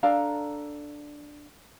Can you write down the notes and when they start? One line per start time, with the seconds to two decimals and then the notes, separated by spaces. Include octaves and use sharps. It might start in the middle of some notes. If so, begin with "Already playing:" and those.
0.03 D4 A4 F5 A#5